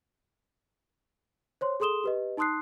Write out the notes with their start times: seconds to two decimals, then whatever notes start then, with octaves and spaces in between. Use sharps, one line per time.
1.61 C5 C#5 C6
1.80 G#4 A4 C6 D#6 E7 G7
2.04 G4 B4 D#5
2.37 D#4 A5 C6 D#6 F#6 C7